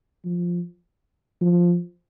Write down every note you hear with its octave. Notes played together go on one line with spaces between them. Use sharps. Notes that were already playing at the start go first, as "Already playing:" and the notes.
F3
F3